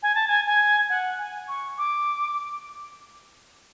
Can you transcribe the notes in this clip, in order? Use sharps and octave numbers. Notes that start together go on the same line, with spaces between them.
G#5
A5
G#5
G#5
F#5
G#5
C#6
D6